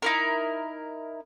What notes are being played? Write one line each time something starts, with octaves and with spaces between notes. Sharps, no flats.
D#4 E4 A#4